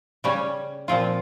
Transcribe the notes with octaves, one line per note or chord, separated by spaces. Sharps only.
C#3 G3 C#4
A#2 F3 C4 F4